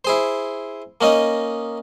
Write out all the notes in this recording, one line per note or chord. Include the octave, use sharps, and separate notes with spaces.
E4 G#4 C5
A#3 C#4 D#4 D#5